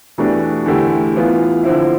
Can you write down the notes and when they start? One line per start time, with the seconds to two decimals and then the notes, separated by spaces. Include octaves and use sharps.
0.18 E2 B2 A3 D4 G4
0.66 E2 D3 A3 E4 G4
1.14 A2 E3 B3 F4
1.64 D3 F3 C4 E4